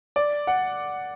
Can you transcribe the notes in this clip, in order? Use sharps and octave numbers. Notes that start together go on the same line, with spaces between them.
D5
F#5